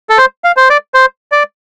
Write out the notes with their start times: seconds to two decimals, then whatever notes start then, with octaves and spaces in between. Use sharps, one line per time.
0.09 A4
0.18 C5
0.44 F5
0.57 C5
0.70 D5
0.94 C5
1.32 D5